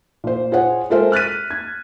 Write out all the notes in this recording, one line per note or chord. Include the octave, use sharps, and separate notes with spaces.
A#2 C5
F4 G#4 C5 C#5 F#5
G#3 F4 A4 A#4 C5 E5
F6 F#6 A6 B6 D#7
G#6